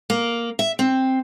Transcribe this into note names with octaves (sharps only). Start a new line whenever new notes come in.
A#3
E5
C4